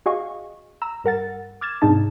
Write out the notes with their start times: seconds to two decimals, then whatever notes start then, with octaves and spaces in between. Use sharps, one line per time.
0.06 F#4 G#4 D#5 F5 C#6
0.82 A#5 E6
1.04 G2 A#4 F#5 A6
1.61 D6 F6 G#6 A6 E7
1.82 G#2 C3 D4 D#4 G#4 A5